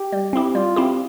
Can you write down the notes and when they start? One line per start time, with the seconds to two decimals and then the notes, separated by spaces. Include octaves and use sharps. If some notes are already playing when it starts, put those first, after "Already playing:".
Already playing: G4
0.13 G3
0.33 C4 E4 G4
0.55 G3 F4
0.76 C4 E4 G4